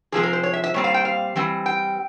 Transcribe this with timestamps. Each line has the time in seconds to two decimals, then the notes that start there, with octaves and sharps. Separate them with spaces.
0.12 C3 F3 G#3 C4 G#4
0.23 A#4
0.33 C5
0.43 C#5
0.53 E5
0.64 E5
0.74 A#2 G3 C4 C#5
0.84 F5
0.94 G5
1.05 F5
1.36 E3 G3 C4
1.66 G5